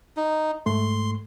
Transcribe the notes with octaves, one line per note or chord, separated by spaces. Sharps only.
D#4
G#2 A3 C6